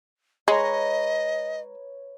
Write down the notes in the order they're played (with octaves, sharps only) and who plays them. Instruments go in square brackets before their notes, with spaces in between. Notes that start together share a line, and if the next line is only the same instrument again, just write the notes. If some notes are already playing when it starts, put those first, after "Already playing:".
[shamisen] G#3 [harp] B4 C#5 A#5 [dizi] D#5